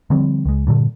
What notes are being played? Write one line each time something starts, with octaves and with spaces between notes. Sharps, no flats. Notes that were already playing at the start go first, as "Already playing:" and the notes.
D3 F3 G3 C4
C#2 G#3
G2 A#2 D3